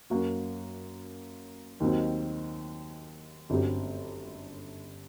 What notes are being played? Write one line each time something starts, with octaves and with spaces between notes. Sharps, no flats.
F#2 F#3 A#3 F#4
D#2 D#3 F#3 C4
G1 F#2 F#3 C4 G4